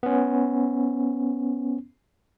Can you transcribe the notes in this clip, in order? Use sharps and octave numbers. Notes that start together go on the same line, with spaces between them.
B3 C#4